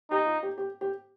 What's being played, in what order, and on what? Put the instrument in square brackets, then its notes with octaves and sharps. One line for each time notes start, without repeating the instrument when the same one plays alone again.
[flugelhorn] D#4 [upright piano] G4
[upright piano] F4
G4
G4
G4